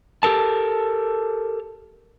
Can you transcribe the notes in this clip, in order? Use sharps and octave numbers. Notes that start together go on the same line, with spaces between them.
G4 A4 A#4 A5